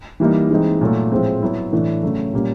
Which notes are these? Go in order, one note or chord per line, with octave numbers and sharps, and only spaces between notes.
E3 G3 A#3 D#4
E3 G#3 C4 D#4
A#2 F#3 A3
A2 F3 G#3 C4
F#3 B3 E4
A2 E3 A3 D4
C#3 F#3 A3
A#2 G3 A#3 C#4